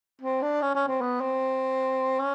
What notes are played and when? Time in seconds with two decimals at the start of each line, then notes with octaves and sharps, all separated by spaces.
0.22 C4
0.42 D4
0.62 C#4
0.75 C#4
0.88 C4
1.01 B3
1.21 C4
2.19 C#4